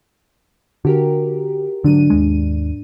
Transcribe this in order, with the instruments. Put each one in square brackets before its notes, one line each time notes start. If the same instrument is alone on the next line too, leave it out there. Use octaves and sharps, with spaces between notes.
[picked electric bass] D3 [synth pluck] F#4 G4 A#4
[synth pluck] G#2 D4 D#7 [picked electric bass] D3 F#3
[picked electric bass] D#2 G#3